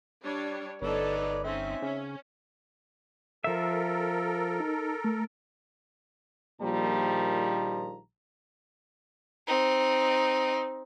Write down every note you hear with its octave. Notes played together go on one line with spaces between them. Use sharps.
G3 D4 C#5
G1 D4 D#4 A4 B4 C#5 D5
C4 C#4 D#4 E5
C#3 C#4
F3 A4 A#4 E5
D#4
A3
A#1 A#2 D#3 F3 G3 A#5
C4 D#4